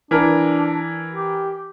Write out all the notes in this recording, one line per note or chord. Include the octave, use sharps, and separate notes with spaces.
E3 D4 A#4
G4